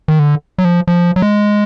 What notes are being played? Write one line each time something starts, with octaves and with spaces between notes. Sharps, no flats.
D#3
D3
F#3
F3
F3
F#3
G#3